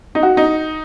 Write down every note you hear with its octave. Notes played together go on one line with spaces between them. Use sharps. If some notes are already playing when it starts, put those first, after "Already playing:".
D#4
F#4
D#4